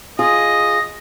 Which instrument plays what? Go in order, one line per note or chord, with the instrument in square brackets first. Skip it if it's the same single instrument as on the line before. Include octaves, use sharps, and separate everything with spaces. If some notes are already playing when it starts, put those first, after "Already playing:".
[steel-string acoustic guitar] F4 G#4 [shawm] D#5